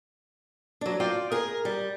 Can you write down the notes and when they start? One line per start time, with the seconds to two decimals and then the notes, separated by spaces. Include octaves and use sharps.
0.81 F#3 D4
1.00 F4 D5 G5
1.32 G#4 A#4
1.65 G3